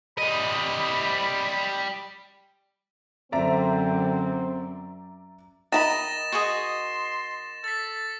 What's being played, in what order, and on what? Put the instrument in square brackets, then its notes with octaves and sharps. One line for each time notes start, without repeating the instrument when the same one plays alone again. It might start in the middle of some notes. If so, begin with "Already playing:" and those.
[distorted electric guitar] G3 D#5 [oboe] B5
[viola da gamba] F#2 [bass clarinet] D3 [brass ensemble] C4 [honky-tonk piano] D5 E5 A#5
[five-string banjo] D#3 A#5 B5 [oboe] D#5 [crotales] A6 A#6 E7
[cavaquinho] F#4 G#4 D#5 [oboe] C6
[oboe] A4 [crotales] A6 B6